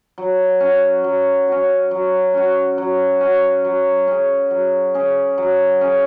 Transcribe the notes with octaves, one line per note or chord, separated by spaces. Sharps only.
F#3
C#4 F#4
F#3
C#4 F#4
F#3
C#4 F#4
F#3
C#4 F#4
F#3
C#4 G#4
F#3
C#4 G#4
F#3
C#4 G#4